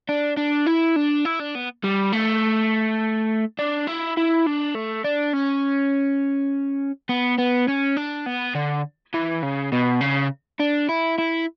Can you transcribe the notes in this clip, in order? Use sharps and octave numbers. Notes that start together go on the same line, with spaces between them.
D4
D4
E4
D4
E4
D4
B3
G3
A3
D4
E4
E4
D4
A3
D4
C#4
B3
B3
C#4
D4
B3
D3
E3
C#3
B2
C#3
D4
E4
E4